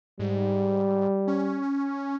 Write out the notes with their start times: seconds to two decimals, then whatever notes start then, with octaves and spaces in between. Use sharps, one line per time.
0.19 G#2 G3
1.27 C#4